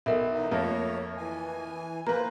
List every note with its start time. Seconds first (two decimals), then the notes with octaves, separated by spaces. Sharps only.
0.06 B1 A4 A#4 E5
0.33 E2 D#4
0.51 F2 A3 A#3 C#5
1.17 E3 G#5
2.07 A#3 F4 B4 C5 A#5